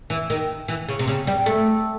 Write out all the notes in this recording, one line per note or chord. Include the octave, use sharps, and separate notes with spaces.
E3
D#3
E3
C#3
C3
C#3
G3
A3